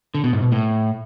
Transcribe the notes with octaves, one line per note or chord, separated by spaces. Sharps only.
D3
B2
G#2
B2
A2